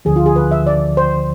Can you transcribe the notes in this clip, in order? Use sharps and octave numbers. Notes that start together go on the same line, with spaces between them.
D2 D3 F3 G#4
F4
G#4
B4
E5
D5
C5